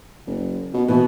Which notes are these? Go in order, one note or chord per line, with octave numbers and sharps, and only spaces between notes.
F#1
B2
B2 E3